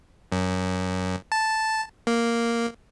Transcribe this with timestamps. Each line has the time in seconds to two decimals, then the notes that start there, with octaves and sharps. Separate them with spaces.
0.32 F#2
1.32 A5
2.07 A#3